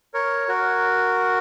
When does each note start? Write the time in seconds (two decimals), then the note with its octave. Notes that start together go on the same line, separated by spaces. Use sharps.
0.14 A#4 C#5
0.48 F#4 A#4